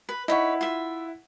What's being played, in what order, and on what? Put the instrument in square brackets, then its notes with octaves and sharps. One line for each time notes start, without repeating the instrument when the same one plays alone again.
[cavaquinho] B4
[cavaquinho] D#4 B4 C#5 [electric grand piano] E4 F#5
[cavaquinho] F4 E5